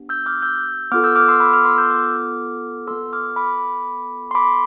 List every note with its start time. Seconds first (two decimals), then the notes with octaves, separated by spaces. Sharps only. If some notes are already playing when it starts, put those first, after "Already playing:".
Already playing: B3 D4 G4
0.09 E6 G6
0.26 D6 F6
0.42 E6 G6
0.92 B3 F4 A4 D6 F6
1.04 E6 G6
1.16 D6 F6
1.28 C6 E6
1.40 B5 D6
1.53 D6 F6
1.65 C6 E6
1.78 E6 G6
1.90 D6 F6
2.87 B3 F4 A4 C6 E6
3.13 D6 F6
3.36 B5 D6
4.31 C6
4.35 B5 D6